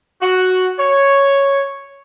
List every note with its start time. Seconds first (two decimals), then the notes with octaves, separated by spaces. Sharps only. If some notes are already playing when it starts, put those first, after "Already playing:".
0.22 F#4
0.79 C#5